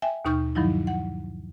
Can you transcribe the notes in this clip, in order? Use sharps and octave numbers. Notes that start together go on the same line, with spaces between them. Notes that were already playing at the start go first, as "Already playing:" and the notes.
E5 G5 G#5
D#2 B2 D#4 C#6 F6 G6
G2 D#3 F3 F#3 D#4 E4
F#5